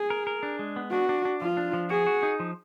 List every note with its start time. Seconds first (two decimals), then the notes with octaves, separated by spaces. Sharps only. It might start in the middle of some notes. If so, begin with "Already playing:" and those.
Already playing: G#4
0.10 A#4
0.27 A#4
0.43 D4
0.59 G#3
0.76 B3
0.92 D4 F#4
1.09 D4
1.25 D4
1.42 F3 F4
1.57 D4
1.73 F3
1.90 F#4 G#4
2.06 F#4
2.23 D#4
2.40 F3